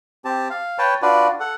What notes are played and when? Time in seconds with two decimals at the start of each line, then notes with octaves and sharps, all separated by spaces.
0.25 C4 G4 A5
0.50 F5
0.78 B4 C#5 G5 A5
1.02 D4 F4 F#4 B4 D5
1.40 A4 F#5